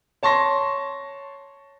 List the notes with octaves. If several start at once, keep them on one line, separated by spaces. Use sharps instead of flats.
C#5 A5 C6 C#6 A#6